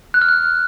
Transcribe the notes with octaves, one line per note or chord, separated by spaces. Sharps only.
F#6
F6
F#6